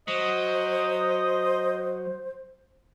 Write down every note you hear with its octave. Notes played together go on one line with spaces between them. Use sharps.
F#3 C5 D#5